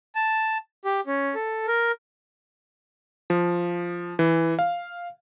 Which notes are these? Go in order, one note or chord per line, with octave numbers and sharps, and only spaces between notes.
A5
G4
C#4
A4
A#4
F3
E3
F5